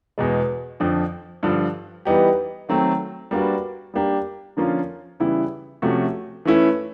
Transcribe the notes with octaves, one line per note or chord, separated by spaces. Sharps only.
E2 B2 G#3
F2 D3 F3
G2 D3 F3
E3 G3 B3 D#4 G4
D#3 F#3 A3 C4
G3 A#3 D4 F#4 B4
G3 A#3 D4 G4
D3 F3 A#3 C#4 F4
C#3 E3 G3 B3 E4
C3 F3 A3 C#4 F#4
E3 A3 C#4 E4